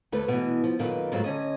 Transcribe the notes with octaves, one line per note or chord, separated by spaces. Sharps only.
D2 A3 B4
B2 E3
F3
F#2 A#2 D#3 A4 B4
G#2 D#3 F#3 G#3 A3 F4
D3 C#4 D#5